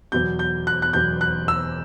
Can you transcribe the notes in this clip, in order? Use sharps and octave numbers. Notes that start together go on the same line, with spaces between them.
E2 B2 F#3 G6
G6
F#6
F#6
E2 B2 F#3 G6
F#6
E6